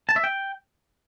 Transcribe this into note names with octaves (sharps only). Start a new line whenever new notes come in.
A5
E5
G5